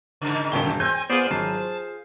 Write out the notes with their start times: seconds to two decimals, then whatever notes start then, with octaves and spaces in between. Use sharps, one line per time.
0.22 G#2 C#3
0.52 E1 G2 C3 D#3 G7
0.80 C4 G#5 G6
1.10 B3 F4 G#4 C5 D5
1.31 G#1 F#3 A5 C7
1.56 C5